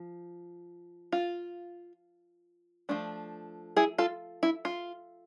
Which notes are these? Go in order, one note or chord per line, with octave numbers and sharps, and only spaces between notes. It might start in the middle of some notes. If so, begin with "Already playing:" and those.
Already playing: F3
F4
F3 A3 D4
E4 G#4
F4 A4
E4
F4